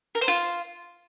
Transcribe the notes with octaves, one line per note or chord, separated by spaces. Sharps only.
A#4
C5
F4